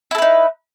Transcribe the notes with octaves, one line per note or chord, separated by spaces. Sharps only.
D#4 E4 A4 B4